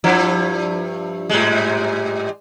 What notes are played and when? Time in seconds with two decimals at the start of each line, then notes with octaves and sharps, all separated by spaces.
0.04 G2 F3 E4
1.30 G#2 G3 G#3